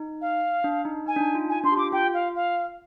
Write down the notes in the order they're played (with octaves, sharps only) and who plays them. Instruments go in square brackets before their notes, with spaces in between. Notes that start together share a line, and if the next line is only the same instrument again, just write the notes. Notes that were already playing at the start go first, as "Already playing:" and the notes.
Already playing: [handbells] D#4
[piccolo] F5
[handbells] D4
D#4
[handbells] D#4 [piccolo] G#5
[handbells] D4
D#4
F4
[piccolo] G#5
[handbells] D4 [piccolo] C6
[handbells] G4
[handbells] F4 [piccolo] D6
[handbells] F4 [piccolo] G5
[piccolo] F5
F5